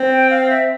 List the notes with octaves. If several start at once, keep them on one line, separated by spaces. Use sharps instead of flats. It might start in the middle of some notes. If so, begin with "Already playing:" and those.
Already playing: C4
G5
F5
E5